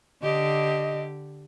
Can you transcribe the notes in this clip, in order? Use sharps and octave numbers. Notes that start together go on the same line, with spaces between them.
D3 G4 D#5